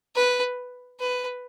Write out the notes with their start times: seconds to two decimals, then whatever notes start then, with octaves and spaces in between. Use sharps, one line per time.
0.16 B4
1.00 B4